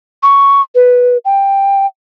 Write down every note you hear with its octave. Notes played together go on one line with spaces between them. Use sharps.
C#6
B4
G5